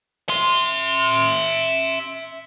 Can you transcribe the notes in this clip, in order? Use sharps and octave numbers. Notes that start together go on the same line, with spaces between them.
E5 C6